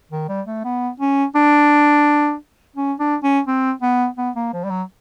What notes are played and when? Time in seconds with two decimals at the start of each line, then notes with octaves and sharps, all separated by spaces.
0.12 D#3
0.29 G3
0.47 A3
0.64 B3
1.00 C#4
1.35 D4
2.76 C#4
2.99 D4
3.23 C#4
3.47 C4
3.82 B3
4.18 B3
4.36 A#3
4.53 F3
4.64 G3
4.70 F#3